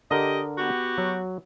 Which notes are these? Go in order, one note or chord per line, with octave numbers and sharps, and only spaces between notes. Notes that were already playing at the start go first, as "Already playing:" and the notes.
D3 G4 A#4 D#5
B3 F#4 G4
F#3